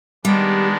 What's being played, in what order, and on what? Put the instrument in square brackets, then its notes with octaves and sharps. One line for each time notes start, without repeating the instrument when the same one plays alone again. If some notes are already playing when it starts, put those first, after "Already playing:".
[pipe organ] D#3 G#3 B3 D4 [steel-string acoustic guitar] G3